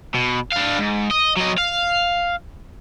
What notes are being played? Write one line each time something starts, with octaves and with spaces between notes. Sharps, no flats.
B2
D4 F5
G#2
D#5
F#3 D#5
F5